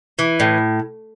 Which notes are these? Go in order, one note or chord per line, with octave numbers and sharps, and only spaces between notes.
E3
A2